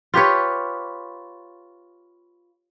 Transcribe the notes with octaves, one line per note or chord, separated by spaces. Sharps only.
F4 G4 B4 C#5